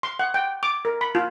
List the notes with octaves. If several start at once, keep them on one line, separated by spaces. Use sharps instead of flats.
C6
F#5
G5
D6
A#4
B5
F4